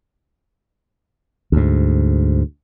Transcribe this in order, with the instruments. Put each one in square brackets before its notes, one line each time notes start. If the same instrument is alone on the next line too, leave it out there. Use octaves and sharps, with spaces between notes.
[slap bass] D2 G#2